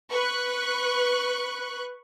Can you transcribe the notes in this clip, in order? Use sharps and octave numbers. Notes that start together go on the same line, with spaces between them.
B4 C#6 F#6